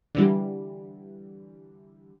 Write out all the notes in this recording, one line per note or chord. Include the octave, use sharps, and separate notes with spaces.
D3 E3 G3